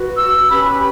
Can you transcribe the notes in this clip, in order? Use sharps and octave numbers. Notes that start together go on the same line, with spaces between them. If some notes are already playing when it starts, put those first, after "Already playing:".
Already playing: F#4 B4
E6
C#4 G4 B4 B5
B5